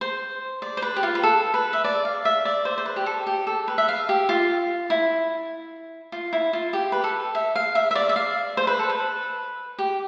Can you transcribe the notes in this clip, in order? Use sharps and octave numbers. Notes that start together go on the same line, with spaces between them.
C5
D5
C5
B4
G4
F4
B4
A4
B4
E5
D5
F5
E5
D5
C5
C5
B4
G4
A4
G4
A4
B4
E5
F5
G4
F4
E4
F4
E4
F4
G4
B4
A4
E5
F5
E5
E5
D5
E5
F5
C5
B4
A4
B4
G4